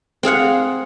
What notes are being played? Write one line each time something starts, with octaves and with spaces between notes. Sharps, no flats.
C4 G#4 F5 F#5